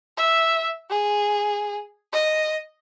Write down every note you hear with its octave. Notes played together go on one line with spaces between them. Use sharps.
E5
G#4
D#5